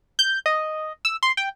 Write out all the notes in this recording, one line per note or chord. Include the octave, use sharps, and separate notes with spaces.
G6
D#5
E6
C6
G5